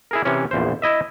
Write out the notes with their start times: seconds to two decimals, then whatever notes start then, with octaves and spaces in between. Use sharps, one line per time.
0.11 E4 G#4 A#4
0.25 C3 E3 C#4
0.51 A#1 E2 C5
0.82 E4 D#5 E5